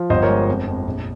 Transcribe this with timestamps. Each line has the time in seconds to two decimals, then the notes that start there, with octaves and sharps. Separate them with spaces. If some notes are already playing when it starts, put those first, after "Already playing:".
Already playing: F3
0.10 G1 C5 D#5
0.22 A#4 C#5
0.29 G#3
0.48 F2
0.67 F2
0.86 A#1